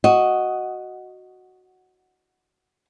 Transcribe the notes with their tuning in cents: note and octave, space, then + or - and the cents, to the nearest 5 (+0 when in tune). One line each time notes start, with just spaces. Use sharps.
F#4 +0 D#5 +0